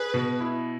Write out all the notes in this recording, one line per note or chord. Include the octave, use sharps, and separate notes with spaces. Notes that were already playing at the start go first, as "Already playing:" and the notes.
Already playing: G#4 B4
B2
E4